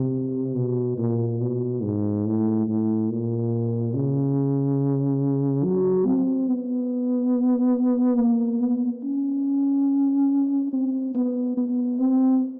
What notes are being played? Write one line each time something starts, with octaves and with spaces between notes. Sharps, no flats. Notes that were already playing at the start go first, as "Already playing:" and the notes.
Already playing: C3
B2
A#2
B2
G#2
A2
A2
A#2
C#3
F#3
C4
B3
A#3
B3
C#4
C4
B3
B3
C4